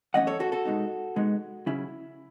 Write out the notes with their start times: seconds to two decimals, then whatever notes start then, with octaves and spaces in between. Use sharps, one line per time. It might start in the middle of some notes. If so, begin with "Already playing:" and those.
0.14 F#2 E3 A3 C#4 D#5 F#5
0.27 A4 C#5
0.40 F#4 A4
0.52 F#4 A4
0.65 B2 G#3 B3 D#4
1.16 B2 G#3 B3 D#4
1.66 C#3 F#3 C#4 E4